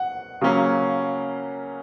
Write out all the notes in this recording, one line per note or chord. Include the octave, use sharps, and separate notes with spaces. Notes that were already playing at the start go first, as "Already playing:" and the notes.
Already playing: F#5
C#3 F#3 A#3 C#4